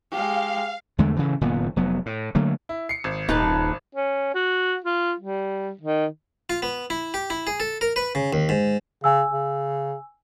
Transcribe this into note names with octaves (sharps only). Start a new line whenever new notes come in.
G#3 G4 F5
E2 D3 G#3 A3
A2 C#3 E3
F#1 A#2 D#3 B3
F1 F#3 B3
A2
D3 F#3 A3 A#3
E4
C7 C#7
G#1
D#1 D#4 B4 A5
C#4
F#4
F4
G3
D#3
F4
B3
E4
G4
E4
G#4
A4
A#4
B4
C#3
D#2
G#2
C#3 G#5 E6
C#3